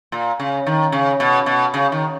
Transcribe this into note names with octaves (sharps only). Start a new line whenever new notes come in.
A#2
C#3
D#3
C#3
B2
B2
C#3
D#3